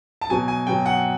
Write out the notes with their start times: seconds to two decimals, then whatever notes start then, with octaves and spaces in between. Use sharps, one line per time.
0.21 A5
0.29 B2 F#3 G#5
0.48 G#5
0.67 B2 F#3 G5
0.86 F#5